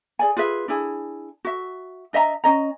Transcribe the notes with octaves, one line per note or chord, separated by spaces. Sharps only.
G#4 D5 G#5
F4 G#4 B4 E5
D4 E4 G#4
F#4 E5
D4 D#5 E5 A#5
C#4 D#5 A#5